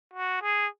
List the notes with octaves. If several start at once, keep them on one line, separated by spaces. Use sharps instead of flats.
F#4
G#4